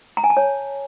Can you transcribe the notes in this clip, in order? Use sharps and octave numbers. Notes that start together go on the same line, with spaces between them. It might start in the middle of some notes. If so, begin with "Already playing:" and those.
A#5
G#5
A5
C#5